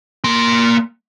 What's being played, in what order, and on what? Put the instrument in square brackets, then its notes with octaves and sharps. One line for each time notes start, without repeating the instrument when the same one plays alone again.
[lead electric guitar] A#3 C6